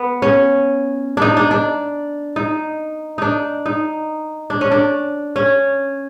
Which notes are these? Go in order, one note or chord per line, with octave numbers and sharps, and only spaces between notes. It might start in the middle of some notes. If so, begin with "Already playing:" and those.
Already playing: B3
C#4
D4 D#4
D4
D4
D#4
D4 D#4
D#4
D4
C#4
D4
C#4